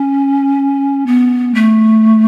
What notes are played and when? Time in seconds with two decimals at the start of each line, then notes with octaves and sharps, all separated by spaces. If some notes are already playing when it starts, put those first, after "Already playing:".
Already playing: C#4
1.06 B3
1.54 A3